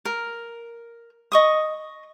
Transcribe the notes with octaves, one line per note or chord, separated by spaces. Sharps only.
A#4
D#5 C#6 D#6